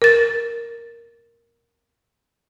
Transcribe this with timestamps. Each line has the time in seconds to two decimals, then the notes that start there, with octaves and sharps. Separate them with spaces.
0.02 A#4 A6